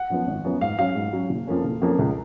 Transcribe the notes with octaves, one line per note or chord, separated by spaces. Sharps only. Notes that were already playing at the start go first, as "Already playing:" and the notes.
Already playing: F#5
F#2 F3 B3
G#1
F#2 F3 B3
G#2 F5
F#3 C#4 F5
G#2
F#3 C#4
F#1
F2 F3 A#3 C#4
F#1
F2 F3 A#3 C#4
C#2